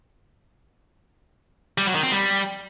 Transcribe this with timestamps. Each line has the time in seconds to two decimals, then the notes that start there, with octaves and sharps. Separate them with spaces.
1.78 G3
1.86 F#3
1.95 D#3
2.03 C4
2.12 G3